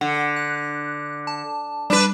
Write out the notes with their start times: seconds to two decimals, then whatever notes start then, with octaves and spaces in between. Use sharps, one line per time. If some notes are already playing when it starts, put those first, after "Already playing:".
0.01 D3 F#5
0.36 F#6
1.27 A5
1.90 G3 D4 B4